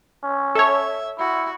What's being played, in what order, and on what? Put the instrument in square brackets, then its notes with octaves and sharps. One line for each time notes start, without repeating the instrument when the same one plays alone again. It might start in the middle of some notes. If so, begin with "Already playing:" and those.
[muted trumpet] C#4
[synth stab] A4 C#5 [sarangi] E5
[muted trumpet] E4 [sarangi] F#4